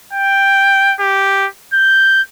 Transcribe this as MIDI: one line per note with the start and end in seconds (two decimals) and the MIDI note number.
0.13 0.94 79
1.00 1.47 67
1.74 2.21 91